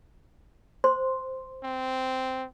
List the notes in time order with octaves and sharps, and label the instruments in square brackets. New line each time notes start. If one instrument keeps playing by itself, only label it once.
[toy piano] C5 C6
[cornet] C4